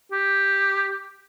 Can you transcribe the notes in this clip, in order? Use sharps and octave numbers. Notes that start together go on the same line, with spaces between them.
G4